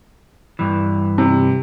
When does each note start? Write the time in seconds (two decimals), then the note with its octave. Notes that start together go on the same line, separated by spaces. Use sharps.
0.59 G2 E3
1.18 C3